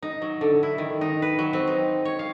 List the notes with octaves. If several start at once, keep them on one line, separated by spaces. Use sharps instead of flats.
D#4
F#3
D3
E4
D#3
D#4
B4
F#3
C4
D#4
C#5
F5